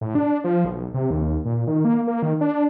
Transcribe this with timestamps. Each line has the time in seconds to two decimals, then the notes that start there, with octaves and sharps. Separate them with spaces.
0.01 A2
0.15 D4
0.44 F3
0.65 B1
0.94 C3
1.11 D#2
1.45 A#2
1.67 D#3
1.85 A#3
2.07 A#3
2.22 D#3
2.41 D4